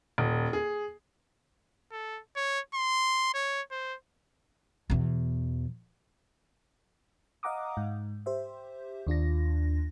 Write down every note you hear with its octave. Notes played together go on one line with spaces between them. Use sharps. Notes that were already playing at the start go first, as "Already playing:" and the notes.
D#1
G#4
A4
C#5
C6
C#5
C5
E2 B2
D#5 F5 F#5 A#5 D6 D#6
G#2
G4 C5 E5
D#2 D4 F4 A#6